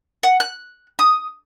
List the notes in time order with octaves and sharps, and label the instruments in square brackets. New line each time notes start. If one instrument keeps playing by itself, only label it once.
[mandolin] F#5
F#6
D#6